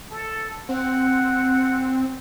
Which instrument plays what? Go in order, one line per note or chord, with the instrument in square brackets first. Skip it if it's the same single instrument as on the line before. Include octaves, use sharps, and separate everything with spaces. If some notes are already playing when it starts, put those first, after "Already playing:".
[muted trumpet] A4
[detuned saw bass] C4 [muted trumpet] F#5